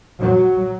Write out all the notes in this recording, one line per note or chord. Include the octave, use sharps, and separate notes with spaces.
F#3